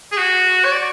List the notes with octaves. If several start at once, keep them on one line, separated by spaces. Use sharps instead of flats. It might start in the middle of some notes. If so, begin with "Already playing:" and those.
G#4
F#4
C#5
D5